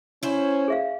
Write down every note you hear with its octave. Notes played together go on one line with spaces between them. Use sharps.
C#4 E4 C5
G#4 E5 F5